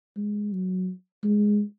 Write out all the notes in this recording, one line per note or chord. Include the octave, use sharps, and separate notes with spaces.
G#3
F#3
G#3